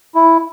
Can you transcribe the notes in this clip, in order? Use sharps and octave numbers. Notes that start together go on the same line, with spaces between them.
E4